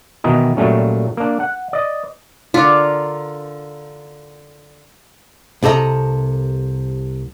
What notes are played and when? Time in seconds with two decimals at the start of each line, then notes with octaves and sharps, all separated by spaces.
0.24 B2 D#3 E3 D#4
0.57 A#2 F#3 G3 A3 C#4
1.17 A#3 D4
1.40 F#5
1.73 D5 D#5
2.54 D3 F4 A#4
5.63 C2 C3 A4 D#5 A#5